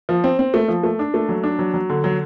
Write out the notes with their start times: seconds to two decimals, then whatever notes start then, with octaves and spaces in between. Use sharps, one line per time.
0.09 F3
0.24 C4
0.39 C4
0.54 A3
0.68 F3
0.83 A3
0.99 D4
1.14 A3
1.29 F#3
1.43 D4
1.59 F#3
1.74 F#3
1.89 D3
2.04 F#3